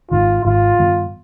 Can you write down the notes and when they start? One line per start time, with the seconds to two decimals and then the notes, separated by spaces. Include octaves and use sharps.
0.11 G#1 G#2 D#3 F4
0.45 G#1 G#2 D#3 F4
0.79 G2 D#3 G3 B3